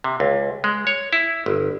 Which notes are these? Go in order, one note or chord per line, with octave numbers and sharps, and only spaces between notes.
C3
C#2
G#3
C#5
E4
G1